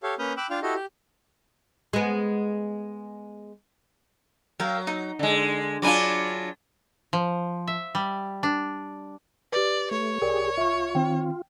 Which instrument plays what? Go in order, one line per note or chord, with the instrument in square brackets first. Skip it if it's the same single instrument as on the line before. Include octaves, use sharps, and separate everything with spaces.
[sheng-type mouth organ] G4 A4 C#5 F5
A#3 C#4 B4 D#6 F6 G6
G5 B5 D6 E6 F#6
D4 F4 F5 G5 F6
E4 F#4 G4 A4 D#5
G4
[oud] G#3 B3
[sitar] F#3 [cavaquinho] A#4 F5 G5
[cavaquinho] D#4
[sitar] D3 G#3
[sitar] F#3 D4 F4 [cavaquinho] G#5 B5 D6
[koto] F3
E5
G3
D4
[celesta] G4 B4 [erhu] D5
[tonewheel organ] A3 [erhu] C#5
[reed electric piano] C2 [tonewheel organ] G4 G#4 [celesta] A#4 D5
[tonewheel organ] F4 [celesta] E5 C#6
[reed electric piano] D#3 C4 [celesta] G5